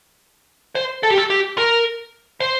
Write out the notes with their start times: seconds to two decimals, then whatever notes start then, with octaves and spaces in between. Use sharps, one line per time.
0.75 C5
1.03 A4
1.10 G4
1.18 A4
1.30 G4
1.58 A#4
2.40 C5